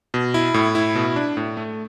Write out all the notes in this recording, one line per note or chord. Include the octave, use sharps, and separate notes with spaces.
B2
E4
A2
E4
B2
D4
A2
A3